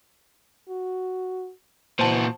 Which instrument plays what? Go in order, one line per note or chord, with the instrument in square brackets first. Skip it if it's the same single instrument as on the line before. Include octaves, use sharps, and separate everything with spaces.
[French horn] F#4
[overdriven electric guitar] A#2 F#4 [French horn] E3 [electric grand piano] C5 A5